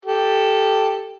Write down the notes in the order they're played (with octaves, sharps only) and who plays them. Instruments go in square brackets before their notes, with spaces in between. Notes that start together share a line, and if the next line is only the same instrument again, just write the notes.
[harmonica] G4 A4